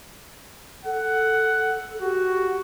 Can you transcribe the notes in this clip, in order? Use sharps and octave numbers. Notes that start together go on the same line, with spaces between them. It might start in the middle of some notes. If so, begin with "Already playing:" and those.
A4 F#5
F#4 G4